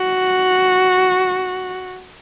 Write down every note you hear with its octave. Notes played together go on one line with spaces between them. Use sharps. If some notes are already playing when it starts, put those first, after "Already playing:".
Already playing: F#4